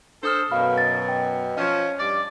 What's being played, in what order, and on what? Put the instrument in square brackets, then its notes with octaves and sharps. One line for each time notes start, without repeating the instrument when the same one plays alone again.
[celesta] D4 D#6 F6 [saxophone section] A4 C5
[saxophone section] F#2 B2 [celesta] F5 B5 F6
[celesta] A6
G5
[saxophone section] F3 C#4 [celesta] D#5
[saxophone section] G2 D5